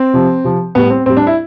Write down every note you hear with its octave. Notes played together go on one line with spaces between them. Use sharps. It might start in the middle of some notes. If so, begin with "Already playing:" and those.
Already playing: C4
C3 F3
C3 F3
A2 G3 B3
C4
A2 G3 C4
D4
E4